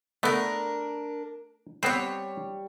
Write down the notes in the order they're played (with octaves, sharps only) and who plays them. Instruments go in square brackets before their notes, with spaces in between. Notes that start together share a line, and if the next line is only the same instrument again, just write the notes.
[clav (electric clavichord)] A3 B3 [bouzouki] D4 A#4
[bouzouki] G3 C#5 [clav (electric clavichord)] B3 C4 C5